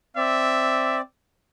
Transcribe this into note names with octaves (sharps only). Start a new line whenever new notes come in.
C4 D5 E5